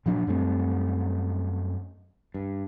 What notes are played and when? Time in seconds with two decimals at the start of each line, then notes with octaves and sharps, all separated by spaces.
0.06 A#2 F3 F#3 D4
0.27 F#2 G3 A3 C4
2.34 G2